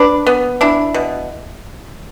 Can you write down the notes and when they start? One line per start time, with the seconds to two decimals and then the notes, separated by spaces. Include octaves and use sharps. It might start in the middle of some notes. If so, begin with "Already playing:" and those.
Already playing: D4 B4 D5
0.27 B3
0.61 D4 E4
0.94 B2